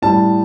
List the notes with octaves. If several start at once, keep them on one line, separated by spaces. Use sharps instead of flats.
A2 G3 A5